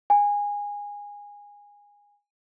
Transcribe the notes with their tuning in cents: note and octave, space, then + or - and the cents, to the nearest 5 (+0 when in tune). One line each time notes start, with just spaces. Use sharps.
G#5 -20